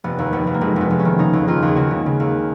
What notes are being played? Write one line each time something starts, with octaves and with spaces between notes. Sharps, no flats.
F1 B3
D#2
F1 B3
F1
A#3
F1 G#3
F1 B3
F1
C#4
D#3
C#3 D#4
D#2
D#2 F4
D#2 G#4
C#3 F#4
C#3
C#3
D#2